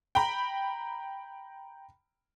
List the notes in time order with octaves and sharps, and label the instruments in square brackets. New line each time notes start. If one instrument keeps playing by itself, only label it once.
[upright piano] G5 A#5 B5